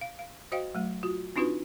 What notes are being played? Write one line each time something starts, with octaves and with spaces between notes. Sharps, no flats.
F5
F5
F#4 C5 D#5 F5 G5
F#3 A3
F4 F#4
C4 D4 D#4 F4 F#4 B4